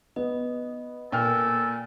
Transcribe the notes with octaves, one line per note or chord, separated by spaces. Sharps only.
B3 D#5
A#2 A4 G5 G#5 F6